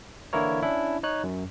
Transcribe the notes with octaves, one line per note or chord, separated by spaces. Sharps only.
D3 E3 A#3 E4 A#4 C#5
C#4 D4 E4
D#4 C#5 F#6
F#2